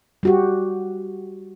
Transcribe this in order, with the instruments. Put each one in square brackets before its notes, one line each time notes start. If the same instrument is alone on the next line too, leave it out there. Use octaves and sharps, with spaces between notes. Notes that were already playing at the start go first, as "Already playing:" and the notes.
[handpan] G3 F#4 G4